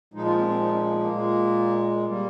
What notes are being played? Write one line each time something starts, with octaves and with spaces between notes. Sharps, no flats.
A#2 F3 G#3 D#4
F4
C4
C4
D#4
C#4
A#3
A#3
A#2 G#3
G3 A#3